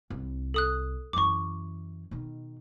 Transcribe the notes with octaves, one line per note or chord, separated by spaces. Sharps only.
C2
A4 D#6 F#6
F#2 E3 C#6 D6
B2 D#3